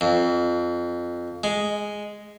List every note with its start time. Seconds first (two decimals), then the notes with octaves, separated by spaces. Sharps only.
0.01 F2
1.44 G#3